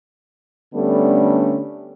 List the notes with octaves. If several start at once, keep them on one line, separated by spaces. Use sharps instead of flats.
D3 G3 A3 B3 C#4 D4